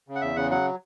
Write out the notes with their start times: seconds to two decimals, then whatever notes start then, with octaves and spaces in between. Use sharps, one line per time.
0.08 C#3
0.15 F#5
0.21 E2 E5
0.36 C#3 F#5
0.51 F#3 F#5